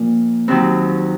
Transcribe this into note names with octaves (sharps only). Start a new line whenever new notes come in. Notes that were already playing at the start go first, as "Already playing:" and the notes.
Already playing: A#2 F3
D#2 D#3 F#3 C4